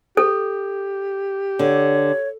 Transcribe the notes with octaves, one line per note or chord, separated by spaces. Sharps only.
G4 A4
D3 C#5